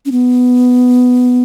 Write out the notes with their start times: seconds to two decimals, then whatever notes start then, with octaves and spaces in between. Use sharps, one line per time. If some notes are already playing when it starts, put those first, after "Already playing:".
0.06 C#4
0.12 B3